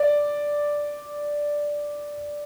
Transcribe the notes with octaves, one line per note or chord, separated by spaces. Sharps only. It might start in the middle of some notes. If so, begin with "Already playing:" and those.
Already playing: D5